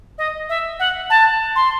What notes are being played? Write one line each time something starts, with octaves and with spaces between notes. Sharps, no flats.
D#5
E5
F#5
A5
C6